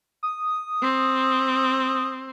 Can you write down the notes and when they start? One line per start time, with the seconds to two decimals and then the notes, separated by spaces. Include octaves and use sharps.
0.23 D#6
0.82 C4